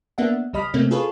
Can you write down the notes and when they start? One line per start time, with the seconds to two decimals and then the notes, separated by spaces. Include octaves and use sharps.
0.18 A#3 B3 D4 E5 F#5
0.53 C#2 G3 D#5 B5 F6
0.74 C3 A3 A#3 C4 C#4
0.91 F4 G#4 A4 B4 C#5